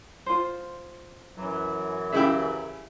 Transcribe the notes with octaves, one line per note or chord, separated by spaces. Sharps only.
F4 C5
F#2 E3 F#3
C#3 E4 G4 G#4 E5